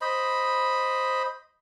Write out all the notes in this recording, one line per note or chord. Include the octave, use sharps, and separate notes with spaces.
C5 D#5 B5